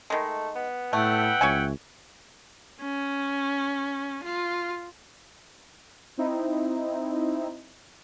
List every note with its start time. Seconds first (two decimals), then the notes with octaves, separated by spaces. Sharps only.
0.10 D#3 G#3 A3
0.55 B3
0.93 A2 A3 E4 F#5 G5
1.41 C#2 C#5 E5 G#5
2.82 C#4
4.24 F4
6.18 C4 D#4 E4